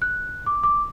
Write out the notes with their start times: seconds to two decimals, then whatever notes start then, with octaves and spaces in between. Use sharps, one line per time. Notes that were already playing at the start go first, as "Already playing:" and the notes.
0.02 F#6
0.46 D6
0.64 D6